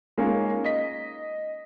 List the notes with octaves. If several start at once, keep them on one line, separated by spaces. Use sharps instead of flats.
G#3 A#3 C#4 D#4 F4
D#5 B6